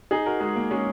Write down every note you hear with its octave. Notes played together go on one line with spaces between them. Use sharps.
D#4 G#4
F#4 A#4
G#3
A#3
G#3 C#4